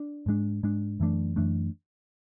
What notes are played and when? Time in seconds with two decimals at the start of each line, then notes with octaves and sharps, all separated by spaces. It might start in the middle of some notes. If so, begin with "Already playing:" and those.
Already playing: D4
0.26 G#2 G#3 D4
0.63 G#2 G#3 D4
1.00 F#2 E3 A3 D4
1.36 F#2 E3 A3 D4